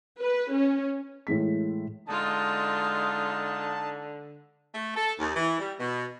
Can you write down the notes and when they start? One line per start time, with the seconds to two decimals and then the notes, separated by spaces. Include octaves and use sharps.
0.21 B4
0.54 C#4
1.27 A2 E3 G#3 B6
2.08 D3 G#3 D#4 F4 A5
4.75 A3
4.97 A4
5.20 D#2
5.36 E3
5.59 G3
5.80 B2